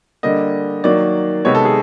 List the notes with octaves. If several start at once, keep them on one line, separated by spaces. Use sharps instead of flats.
D3 G3 A#3 D#5
D#3 F#3 A#3 D5
C3 D#3 G#3 B3 C#5
A4
G#4